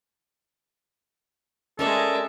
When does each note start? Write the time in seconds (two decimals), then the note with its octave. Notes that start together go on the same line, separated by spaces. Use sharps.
1.79 G#3 C#4 A4 A#4 D5 E5